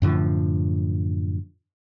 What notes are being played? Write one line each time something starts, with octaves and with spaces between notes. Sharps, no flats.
F#2 A2 D3 F3